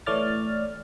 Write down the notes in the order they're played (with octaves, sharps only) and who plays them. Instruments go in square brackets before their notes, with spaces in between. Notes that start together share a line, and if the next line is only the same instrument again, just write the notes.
[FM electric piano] E3 A3 C#5 D5 F6 A6